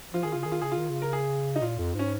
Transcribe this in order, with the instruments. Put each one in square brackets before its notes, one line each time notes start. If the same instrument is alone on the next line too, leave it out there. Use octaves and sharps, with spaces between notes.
[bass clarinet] F3 [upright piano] F4
[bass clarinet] D#3 [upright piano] G#4
[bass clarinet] C#3 [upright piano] F4
[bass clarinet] D#3 [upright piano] G#4
[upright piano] F4
[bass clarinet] C#3 [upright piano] G#4
[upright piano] F4
[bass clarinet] D#3
C#3
[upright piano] A#4
G#4
D#4
[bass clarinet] A#2 [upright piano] F4
[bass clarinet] F2
[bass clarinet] G#2 [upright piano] C#4